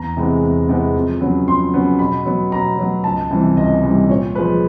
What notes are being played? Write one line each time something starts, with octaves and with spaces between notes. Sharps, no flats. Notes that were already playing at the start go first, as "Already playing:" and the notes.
Already playing: E2 A#5
C3 E3 G#3 B3
E2
C3 E3 G#3 B3
F2
C#3 F#3 B3
F2 C6
C#3 F#3 B3
B2 B5
F#3 B3
B2 A#5
F#3 B3
C#2 A5
C3 E3 G3
C#2 D#5
C3 E3 G3
A#2 C#5
F3 G#3 B4